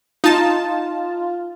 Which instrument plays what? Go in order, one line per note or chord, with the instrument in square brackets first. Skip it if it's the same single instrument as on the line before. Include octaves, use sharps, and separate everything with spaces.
[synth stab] D#4 A5 [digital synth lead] F4